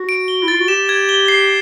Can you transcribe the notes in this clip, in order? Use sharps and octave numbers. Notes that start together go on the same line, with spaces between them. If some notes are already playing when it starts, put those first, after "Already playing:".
Already playing: F#4
D7
G7
E4
F4 A6
F#4
G4 E7
G#6
G7
C7